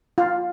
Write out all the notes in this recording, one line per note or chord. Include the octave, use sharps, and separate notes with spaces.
F4